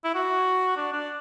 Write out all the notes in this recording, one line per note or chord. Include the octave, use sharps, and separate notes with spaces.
E4
F#4
D4
D4